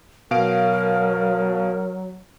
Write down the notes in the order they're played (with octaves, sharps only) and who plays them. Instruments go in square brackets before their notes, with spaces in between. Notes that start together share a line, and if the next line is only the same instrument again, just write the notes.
[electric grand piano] B2 F5 D7 [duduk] F#3 [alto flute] A#4